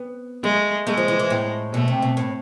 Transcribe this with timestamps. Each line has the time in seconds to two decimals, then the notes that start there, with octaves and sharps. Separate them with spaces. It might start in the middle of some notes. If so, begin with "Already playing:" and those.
Already playing: B3
0.43 G#3 A3
0.87 G#3 A3
0.97 F3
1.08 E3
1.19 E3
1.30 A2
1.74 B2 A3
1.88 C3
2.02 B2
2.17 A2